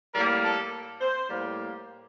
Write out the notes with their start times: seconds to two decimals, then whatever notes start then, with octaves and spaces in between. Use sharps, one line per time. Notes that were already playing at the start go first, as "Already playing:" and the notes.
0.14 A2 G3 A#3 A#4
0.43 A4
1.01 C5
1.29 A2 G3 A#3